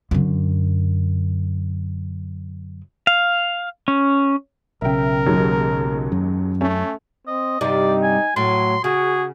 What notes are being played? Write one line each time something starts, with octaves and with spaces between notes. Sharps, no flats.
F#2 D3
F5
C#4
B1 C#3 A#4 E5 G5
D#2 G#2 F#3
F#2
A3 C#4
C4 D#5
G2 C3 D#4 D5
G#5
A2 F#3 C6
C#3 F#4 G#4